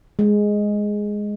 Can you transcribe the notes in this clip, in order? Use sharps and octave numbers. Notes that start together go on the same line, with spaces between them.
G#3